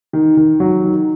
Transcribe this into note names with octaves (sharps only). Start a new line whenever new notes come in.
D#3
D#3
F#3
D#3